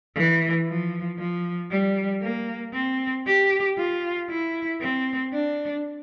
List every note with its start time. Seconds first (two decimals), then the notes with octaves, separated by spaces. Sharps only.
0.15 E3
0.67 F3
1.18 F3
1.71 G3
2.22 A#3
2.74 C4
3.27 G4
3.78 F4
4.30 E4
4.81 C4
5.34 D4